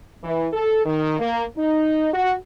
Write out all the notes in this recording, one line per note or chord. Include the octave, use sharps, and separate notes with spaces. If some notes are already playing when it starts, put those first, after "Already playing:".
E3
A4
D#3
A#3
D#4
F#4